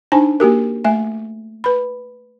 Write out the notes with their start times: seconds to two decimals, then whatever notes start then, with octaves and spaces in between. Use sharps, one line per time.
0.12 D4 D#4 C5 G#5 A5
0.40 A#3 F#4 G4 A#4
0.85 A3 E5 G#5
1.64 B4 B5